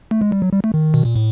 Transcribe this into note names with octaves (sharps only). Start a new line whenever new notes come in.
A3
G#3
G3
F#3
G3
A3
D#3
B2
A#2
A2